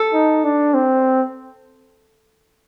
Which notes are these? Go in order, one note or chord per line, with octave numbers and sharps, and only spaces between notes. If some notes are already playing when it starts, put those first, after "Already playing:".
Already playing: A4
D#4
D4
C4